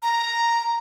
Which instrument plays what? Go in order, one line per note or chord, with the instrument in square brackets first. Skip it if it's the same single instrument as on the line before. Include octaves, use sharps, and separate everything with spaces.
[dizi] A#5